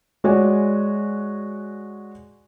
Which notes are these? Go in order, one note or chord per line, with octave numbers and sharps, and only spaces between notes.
G#3 F#4 C#5 D5 G#5